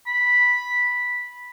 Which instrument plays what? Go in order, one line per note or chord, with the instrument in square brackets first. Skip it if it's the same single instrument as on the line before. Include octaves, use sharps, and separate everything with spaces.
[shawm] B5